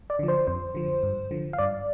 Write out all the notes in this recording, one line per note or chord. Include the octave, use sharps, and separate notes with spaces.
D5
D3 F3
C5
F2 C5
D3 F3
G2
D3 F3
F5
G2 D5